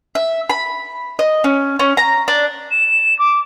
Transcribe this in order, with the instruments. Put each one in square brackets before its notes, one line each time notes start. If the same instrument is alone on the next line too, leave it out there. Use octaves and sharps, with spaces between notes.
[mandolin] E5
B5
D#5
C#4
C#4
A#5
D4
[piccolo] E7
D6